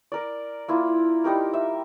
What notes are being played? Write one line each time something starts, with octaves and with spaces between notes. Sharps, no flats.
A#4 D5
A#3 E4 F4
G3 D#4 G4 A#4
E5